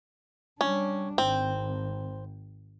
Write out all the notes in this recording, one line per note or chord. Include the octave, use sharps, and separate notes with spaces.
G3 C#4 D4
G#1 C4